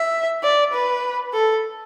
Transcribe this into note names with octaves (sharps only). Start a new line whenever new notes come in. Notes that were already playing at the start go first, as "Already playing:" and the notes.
Already playing: E5
D5
B4
A4